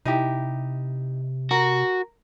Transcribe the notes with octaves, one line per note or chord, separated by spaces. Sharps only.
C3 D#4 E4 G4
F#4 A#4